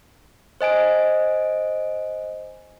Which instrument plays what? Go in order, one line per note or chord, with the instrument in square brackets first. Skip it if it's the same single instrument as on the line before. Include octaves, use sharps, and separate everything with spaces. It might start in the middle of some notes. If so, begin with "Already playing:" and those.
[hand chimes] C5 D#5 G#5 D7